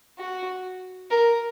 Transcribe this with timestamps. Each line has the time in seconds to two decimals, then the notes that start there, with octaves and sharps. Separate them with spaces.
0.19 F#4
1.10 A#4